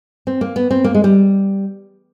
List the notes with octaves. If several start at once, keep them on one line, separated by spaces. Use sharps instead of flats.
C4
A#3
B3
C4
A#3
G#3
G3